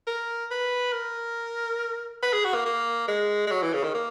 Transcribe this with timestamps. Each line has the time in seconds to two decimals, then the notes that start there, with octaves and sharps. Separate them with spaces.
0.07 A#4
0.51 B4
0.93 A#4
2.23 B4
2.33 G#4
2.44 F#4
2.54 A#3
2.65 A#3
3.08 G#3
3.47 G#3
3.51 F#3
3.62 E3
3.73 C#3
3.83 D#3
3.94 A#3